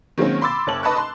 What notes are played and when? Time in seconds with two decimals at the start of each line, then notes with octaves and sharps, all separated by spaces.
0.18 D#3 F#3 G#3 A#3 C4 C#4
0.41 B5 C6 D6 E6 A6
0.67 F#1 C#5 A5 F#7
0.83 B4 D#5 A5 B5 C#6 F#6
0.96 A5 C6